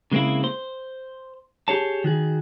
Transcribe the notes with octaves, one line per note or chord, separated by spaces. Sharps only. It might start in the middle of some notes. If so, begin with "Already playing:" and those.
C#3 G#3 A#3 C4 E4
C5
G4 G#4 C#5 A5
D#3 F#4 G#4